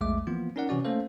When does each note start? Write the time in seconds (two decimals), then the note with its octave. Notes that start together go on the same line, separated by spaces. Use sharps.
0.01 A#1 E2 G#3 A3 E5 D6
0.27 E3 F3 A#3 B3 F4
0.56 C#4 D#4 A#4 D5 F#5
0.69 C3 E3 C#4 F#4 D5
0.84 A3 A#3 C#4 A4 C5 F5